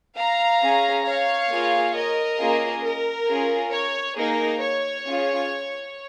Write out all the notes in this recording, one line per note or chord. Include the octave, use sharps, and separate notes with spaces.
F5 A#5
C#4 G#4
C#5 F5
A#3 F4 G#4
A#4 D#5
A#3 C#4 F4 G#4
A#4
C#4 F4 G#4
C#5
A#3 D#4 G#4 A#4
C#5
C#4 F4 G#4